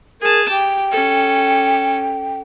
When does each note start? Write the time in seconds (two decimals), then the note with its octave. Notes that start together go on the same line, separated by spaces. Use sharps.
0.21 G#4 A#4 A5
0.50 G4 G5
0.91 C#4 A4